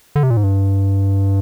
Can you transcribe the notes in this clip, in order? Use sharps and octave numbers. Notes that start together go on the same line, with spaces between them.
D3
C3
A#2
G#2
G2